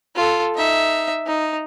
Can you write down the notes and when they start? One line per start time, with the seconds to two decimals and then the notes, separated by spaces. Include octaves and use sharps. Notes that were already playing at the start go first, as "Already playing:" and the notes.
0.16 F4 A4
0.56 D#4 E5
1.27 D#4